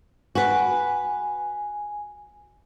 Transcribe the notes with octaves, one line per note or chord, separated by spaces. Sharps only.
F#4 B4 G#5